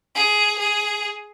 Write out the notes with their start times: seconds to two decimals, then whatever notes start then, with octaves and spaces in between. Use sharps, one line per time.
0.15 G#4
0.59 G#4